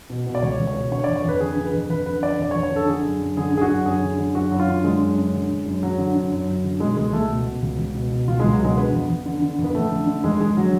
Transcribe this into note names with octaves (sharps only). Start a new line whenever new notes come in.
B2
B2
D5
C#2 C#5
C#2
C#5
B2
D3 C#5
F2 D5
C#5
F2 B4
D3 G#4
D3
B4
F2
F2 B4
D3 B4
D3 D5
F2 D5
C#5
F2
C#5
D3 A4
D3 G#4
F#2
F#2
D3 G#4
D3 G#4
F#4
F#2
F#2 G#4
D3
D3
F#2 F#4
F#2
F4
D3
D3 G#3
F#2
F#2
D3
D3
F#2
F#2 F#3
D3
D3
F#2
F#2
D3
B2 G#3
C#2 G#3
C#2 A3
B2
B2
C#2
C#2
B2
B2
C#2 F4
C#2 G#3
F#3
B2 G#3
D3 B3
F2
F2
D3
D3
F2
B3
F2 A3
D3
D3
F2 G#3
F2 G#3
D3 F#3